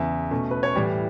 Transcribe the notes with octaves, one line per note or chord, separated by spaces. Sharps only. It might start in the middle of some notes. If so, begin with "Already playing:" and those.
Already playing: E2 C#3 E3 E5
B2 A3 C#4
B4
C#5
A2 E3 G3 D5